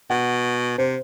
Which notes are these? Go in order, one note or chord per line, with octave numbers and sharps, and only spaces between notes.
B2 F#5
C3 C5